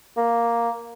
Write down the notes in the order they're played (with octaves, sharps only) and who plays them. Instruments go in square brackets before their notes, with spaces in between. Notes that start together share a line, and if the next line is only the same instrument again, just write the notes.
[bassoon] A#3